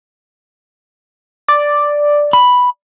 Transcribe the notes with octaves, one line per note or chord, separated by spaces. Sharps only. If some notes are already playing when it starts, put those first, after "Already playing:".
D5
B5